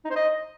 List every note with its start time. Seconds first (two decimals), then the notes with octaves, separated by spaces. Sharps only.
0.05 D#4
0.10 C5
0.15 D#5